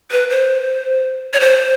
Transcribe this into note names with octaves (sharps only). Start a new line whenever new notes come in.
B4
C5
C#5
C5